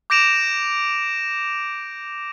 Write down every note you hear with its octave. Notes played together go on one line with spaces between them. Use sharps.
D6 G6 A#6 D7 E7 F7